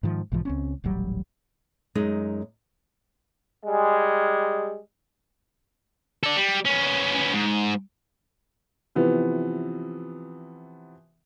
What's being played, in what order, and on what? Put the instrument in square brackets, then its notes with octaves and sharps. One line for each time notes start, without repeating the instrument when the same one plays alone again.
[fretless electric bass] G#2 D#3 F3
B1 G#2 E3 F3
C#2 C4 C#4
D#1 A1 F#3 G3
[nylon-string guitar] F#2 G#3 D#4
[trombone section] G3 G#3
[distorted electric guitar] A4 D5
G3
B3 C#4
G#2
[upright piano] C3 E3 F3 B3